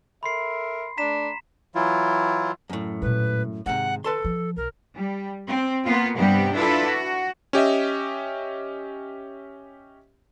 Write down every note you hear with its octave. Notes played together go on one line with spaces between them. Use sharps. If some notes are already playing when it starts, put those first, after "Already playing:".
A4 A#4 E5 B5 C6 C7
A3 D4 A#5 B6 E7
E3 F#3 E4 F4
F#2 A2
A#2 G#3 B4
G#2 C3 D#3 F#5
A4 B4 A5 C6
F3
B1 A#4
G3
C4
A#3 B3 F4
G2 C3 G3 B3 G4
D4 E4 F4 A4 B4
F#4
C#4 G4 D#5 E5